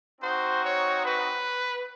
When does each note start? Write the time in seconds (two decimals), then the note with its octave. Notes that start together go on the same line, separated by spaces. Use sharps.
0.21 C4 D#4 F#4 C5
0.62 C#5
1.04 B4